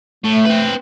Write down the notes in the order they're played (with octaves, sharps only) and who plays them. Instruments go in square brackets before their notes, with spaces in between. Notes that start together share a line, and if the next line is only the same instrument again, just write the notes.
[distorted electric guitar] A2 [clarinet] A3
[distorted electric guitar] C4 B4